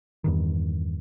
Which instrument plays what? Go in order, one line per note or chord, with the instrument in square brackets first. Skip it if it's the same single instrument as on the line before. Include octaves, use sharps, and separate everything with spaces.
[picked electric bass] E2 G2 D#3